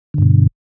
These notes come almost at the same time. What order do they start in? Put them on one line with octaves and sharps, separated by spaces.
D3 G2 B2